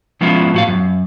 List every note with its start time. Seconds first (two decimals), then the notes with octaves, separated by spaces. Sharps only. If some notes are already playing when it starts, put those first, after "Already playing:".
0.21 F3 G#3 B3 C#4 E4 F4
0.54 A2 F#4 F5
0.68 F#2